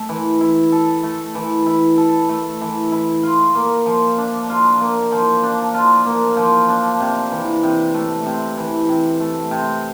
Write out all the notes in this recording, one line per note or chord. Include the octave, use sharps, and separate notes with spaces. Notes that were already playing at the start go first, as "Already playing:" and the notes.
Already playing: A3 A4
E3
E4
A4
A3
E3
E4
A4
A3
E3
E4
F4
A#3
F3
D4
F4
A#3
F3
D4
F4
A#3
F3
D4
C3
E3
C3
A3
C3
E3
C3
A3
C3